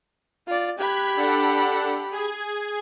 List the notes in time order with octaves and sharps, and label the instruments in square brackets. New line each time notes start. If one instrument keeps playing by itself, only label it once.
[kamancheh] F4 D5
[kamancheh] G4 B5 [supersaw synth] F#6 G#6 B6
[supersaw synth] D4 A4 F#5
G#4 G#6